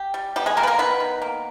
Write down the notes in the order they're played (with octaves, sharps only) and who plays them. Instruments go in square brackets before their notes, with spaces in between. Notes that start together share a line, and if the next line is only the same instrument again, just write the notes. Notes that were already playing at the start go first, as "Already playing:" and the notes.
Already playing: [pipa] G4
G3
G3 B3 G4
G#3 G#4
G3 A#3 A#4
B4
A#3 A#4
D#3 B3 B4
D#3
A#3